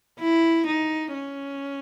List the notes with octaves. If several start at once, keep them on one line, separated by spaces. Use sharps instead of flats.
E4
D#4
C#4